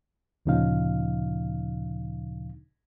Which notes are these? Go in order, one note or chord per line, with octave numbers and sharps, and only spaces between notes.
D2 A#2 C#3 F3 D#4 F5